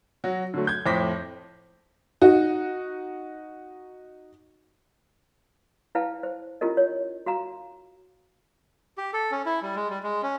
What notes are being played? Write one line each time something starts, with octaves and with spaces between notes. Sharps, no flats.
F#3 F#4
D3 F#3 A3
G6 G#6
F2 A2 C5 D6 A#6 B6
D#4 F#4
E4 B4 F5 G5 A5
C5
C#4 E4 F4 G4 A#4 D#5
C#5
F#4 F5 A#5
G4
A4
C#4
E4
G3
G#3
G3
G#3
C#4